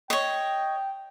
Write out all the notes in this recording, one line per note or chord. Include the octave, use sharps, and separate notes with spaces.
C#5 D#5 G5